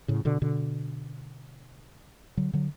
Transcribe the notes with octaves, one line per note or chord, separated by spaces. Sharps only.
A2 C#3
B2 D3
B2 D3
D3 F#3
D3 F#3